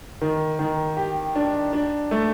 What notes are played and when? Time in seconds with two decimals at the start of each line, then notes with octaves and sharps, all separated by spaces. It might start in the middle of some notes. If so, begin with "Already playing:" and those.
0.21 D#3
0.59 D#3
0.97 G4
1.35 D4
1.73 D4
2.11 A3